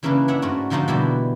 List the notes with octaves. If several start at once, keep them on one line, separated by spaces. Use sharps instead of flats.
C#3 E3 A#3 C#4 D4 B4
D4 C#5 E5 F#5 A#5
G#2 A3 C#4 F#4 A#4
D3 F3 A#3 D#4 F#4 G4
B2 D3 E3 G3 G#3 G4